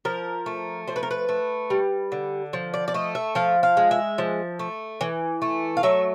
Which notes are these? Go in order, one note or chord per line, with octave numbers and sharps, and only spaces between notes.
F3 A#4
A3
F3 C5
B4
A#4
B4
A3
G3
D3
F3
D5
D5
A3 D#5
E5
F3 F5
F5
G#3
E5
F3
A3
E3
A3
F5
F#3 E5